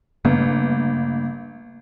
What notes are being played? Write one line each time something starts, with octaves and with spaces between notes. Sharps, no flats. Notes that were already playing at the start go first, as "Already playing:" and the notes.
G1 C#3 A3 A#3